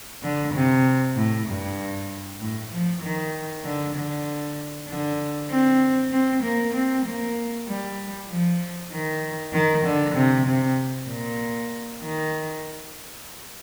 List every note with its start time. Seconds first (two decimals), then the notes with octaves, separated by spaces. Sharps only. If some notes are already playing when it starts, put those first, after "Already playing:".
0.23 D3
0.54 C3
1.16 A2
1.47 G2
2.40 A2
2.71 F3
3.02 D#3
3.64 D3
3.95 D3
4.87 D3
5.50 C4
6.11 C4
6.43 A#3
6.74 C4
7.05 A#3
7.67 G3
8.29 F3
8.91 D#3
9.53 D#3
9.85 D3
10.15 C3
10.46 C3
11.08 A#2
12.01 D#3